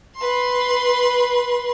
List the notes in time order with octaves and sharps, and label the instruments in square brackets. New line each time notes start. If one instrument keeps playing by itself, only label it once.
[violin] B4 C6